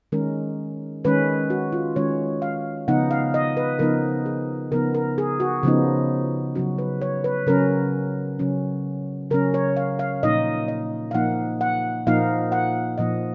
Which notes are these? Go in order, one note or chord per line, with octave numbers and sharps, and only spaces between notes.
D#3 G#3 C#4 A#4
D#3 G#3 C#4 B4
F#4
F4
D#3 G#3 C#4 C#5
F5
C#3 F3 B3 D#4 F#5
F5
D#5
B4
C#3 F3 B3 D#4 A#4
G#4
C#3 F3 B3 D#4 A#4
A#4
G#4
F#4
C#3 F3 B3 D#4
C#3 F#3 C#4 F#4
B4
C#5
B4
C#3 F#3 C#4 A#4
C#3 F#3 C#4
C#3 F#3 C#4 A#4
C#5
F5
F5
A#2 F3 A#3 D#4 D#5
D#5
F5
A#2 F3 A#3 D#4 F#5
F#5
A#2 F3 A#3 D#4 F5
F#5
A#2 F3 A#3 D#4 D#5